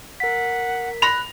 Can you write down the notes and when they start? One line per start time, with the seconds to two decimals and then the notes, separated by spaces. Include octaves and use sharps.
0.20 A#4 F#5 B6
1.02 B5 F#6 A#6 F7